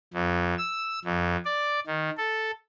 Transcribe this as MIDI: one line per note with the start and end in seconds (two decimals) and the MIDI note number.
0.13 0.54 41
0.58 0.99 88
1.05 1.36 41
1.45 1.80 74
1.87 2.10 51
2.17 2.51 69